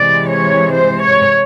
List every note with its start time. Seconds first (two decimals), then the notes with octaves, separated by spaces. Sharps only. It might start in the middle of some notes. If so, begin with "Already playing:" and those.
Already playing: C3 E3 G#3 D5
0.28 C#5
0.72 C5
1.01 C#5